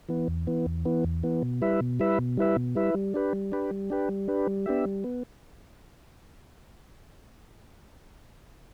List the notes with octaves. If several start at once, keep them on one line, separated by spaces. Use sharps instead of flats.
E3 B3
E2
E3 B3
E2
E3 B3
E2
E3 B3
B2
G3 E4 B4 E5
B2
G3 E4 B4 E5
B2
G3 E4 B4 E5
B2
G3 E4 B4 E5
G3
D4 G4 B4
G3
D4 G4 B4
G3
D4 G4 B4
G3
D4 G4 B4
G3
B3 D4 G4 E5
G3
B3